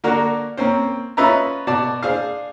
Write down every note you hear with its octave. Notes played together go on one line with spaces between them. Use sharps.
D3 A#3 D4 F#4 A#4
A#3 C4 C#4 C5
C#4 F4 B4 D#5 E5 A#5
B2 D5 A5
D4 G#4 C5 F5